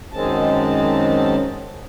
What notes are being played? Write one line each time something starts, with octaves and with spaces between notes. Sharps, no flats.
F#2 D#3 G#3 C4 C#4 A5